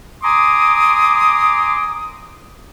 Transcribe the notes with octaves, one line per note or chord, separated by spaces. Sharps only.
G#5 A#5 C6 D6 D#6